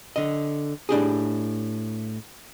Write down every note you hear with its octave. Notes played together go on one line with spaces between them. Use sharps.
D3 D#5
A2 D4 G4 G#4